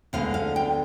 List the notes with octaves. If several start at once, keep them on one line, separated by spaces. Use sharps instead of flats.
D2 D3 G#3 B3 F5
F5
G5